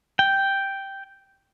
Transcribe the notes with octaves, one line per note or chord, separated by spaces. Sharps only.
G5